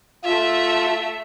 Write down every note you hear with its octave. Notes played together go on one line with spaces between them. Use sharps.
A3 F4 E5